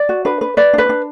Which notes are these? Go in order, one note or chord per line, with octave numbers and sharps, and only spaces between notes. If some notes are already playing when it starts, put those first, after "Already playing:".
Already playing: D5
F#4
D4 B4
B4
B4 D5
D4 B4
D4